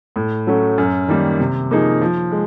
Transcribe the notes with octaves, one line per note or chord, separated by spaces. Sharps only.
A2
F#3 A3 C#4
F#2
D#3 G3 A#3
C3
F3 A#3 D#4 G#4
F3
G#3